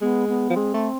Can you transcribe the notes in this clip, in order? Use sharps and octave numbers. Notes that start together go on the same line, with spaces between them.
G#3 B3
B3
F3
G#3 C4
A3